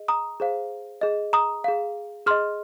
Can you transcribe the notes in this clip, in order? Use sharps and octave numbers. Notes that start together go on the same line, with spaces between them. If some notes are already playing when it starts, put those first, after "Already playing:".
Already playing: G#4 D#5
A#5 D#6
G#4 C5 F5
G#4 D#5
A#5 D#6
G#4 F5
G#4 D#5 C6 F6